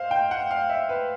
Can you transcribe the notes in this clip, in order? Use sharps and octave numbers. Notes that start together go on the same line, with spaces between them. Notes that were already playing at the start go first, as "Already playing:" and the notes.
Already playing: C5 D#5 F5
G5
F#5
F5
E5
B4